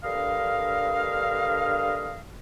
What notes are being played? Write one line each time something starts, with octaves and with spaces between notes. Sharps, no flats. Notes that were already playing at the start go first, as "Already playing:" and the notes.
G2 D3 A#4 D#5 F5